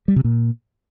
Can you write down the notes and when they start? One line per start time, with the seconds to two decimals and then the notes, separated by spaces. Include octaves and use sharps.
0.08 G3
0.16 C3
0.24 A#2